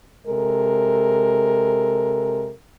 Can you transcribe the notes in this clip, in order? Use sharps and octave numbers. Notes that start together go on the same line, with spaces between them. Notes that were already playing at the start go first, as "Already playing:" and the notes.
C3 G#3 A4 A#4